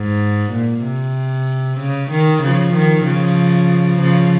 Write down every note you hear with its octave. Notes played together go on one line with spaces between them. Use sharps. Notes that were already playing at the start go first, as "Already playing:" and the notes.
Already playing: G#2
A#2
C3
C#3
D#3
C#3 F3
D#3
C#3 F3
C#3 F3